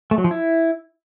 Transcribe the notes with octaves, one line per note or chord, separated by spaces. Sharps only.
A3
F#3
F3
E4